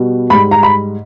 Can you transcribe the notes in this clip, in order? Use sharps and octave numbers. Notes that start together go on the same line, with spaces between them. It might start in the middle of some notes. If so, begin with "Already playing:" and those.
Already playing: B2 G3
G#2 G3 B5
A#5
B5